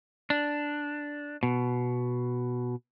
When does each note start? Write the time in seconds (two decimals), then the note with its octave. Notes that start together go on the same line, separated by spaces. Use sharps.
0.30 D4
1.43 B2